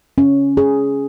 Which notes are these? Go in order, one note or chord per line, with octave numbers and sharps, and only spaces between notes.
C#4
G#4